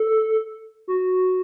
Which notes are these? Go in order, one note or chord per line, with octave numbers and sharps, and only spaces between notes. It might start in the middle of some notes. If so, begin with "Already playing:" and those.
Already playing: A4
F#4